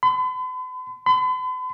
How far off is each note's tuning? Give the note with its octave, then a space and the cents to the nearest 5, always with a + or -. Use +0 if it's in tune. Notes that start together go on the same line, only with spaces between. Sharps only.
B5 +45
B5 +45